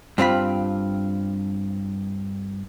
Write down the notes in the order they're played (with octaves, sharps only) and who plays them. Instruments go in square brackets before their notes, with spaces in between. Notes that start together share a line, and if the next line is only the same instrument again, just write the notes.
[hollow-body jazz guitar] G2 C4 F4 B5